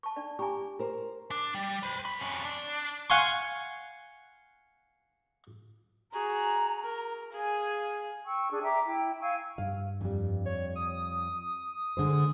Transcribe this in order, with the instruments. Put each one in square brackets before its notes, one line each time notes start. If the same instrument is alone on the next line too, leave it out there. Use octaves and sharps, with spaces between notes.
[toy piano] A5 C#6
D4 D5
[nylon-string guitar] G4 [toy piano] G#5 A#5 C#6
[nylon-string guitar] A#4 C5
[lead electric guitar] D4
G3
B4 C5
F#3 B5
F2 C#4
D4
[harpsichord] F5 F#5 G#5 C6 C#6
[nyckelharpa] F#4 G#4 [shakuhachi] A#5
[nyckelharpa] A#4
[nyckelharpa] G#4 G#5 [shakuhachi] F5
[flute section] G5 C#6 E6
D4 G#4
E5 G5 A#5 D6
E4 G5
F5 G#5 C#6 E6
[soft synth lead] G2 [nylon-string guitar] F5
[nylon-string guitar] F2 G3
[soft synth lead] C#5
D#6
[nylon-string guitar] D3 G#3 C5